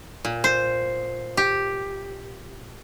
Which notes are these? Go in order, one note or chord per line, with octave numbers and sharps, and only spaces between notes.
A#2
C5
G4